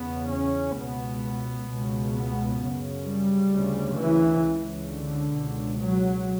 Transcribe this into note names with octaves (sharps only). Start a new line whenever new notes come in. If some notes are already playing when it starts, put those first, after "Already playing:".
Already playing: E2 C#3 B3
C#4
C#2 B2 B3
C#2 B2
B3
F#2 C#3
G3
D2 C#3
E3
C#2 C#3
D3
C#2 B2
F#3